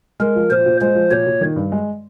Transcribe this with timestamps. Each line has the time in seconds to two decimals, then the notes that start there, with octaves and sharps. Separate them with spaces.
0.20 G#3 A#4
0.35 F3
0.50 A#2 C5
0.66 A#2
0.81 G#3 C5
0.95 F3
1.11 A#2 C#5
1.27 A#2
1.41 D#3
1.56 G2
1.72 G#3